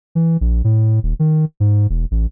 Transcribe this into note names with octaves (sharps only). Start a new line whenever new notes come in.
E3
A#1
A2
D#1
D#3
G#2
E1
A1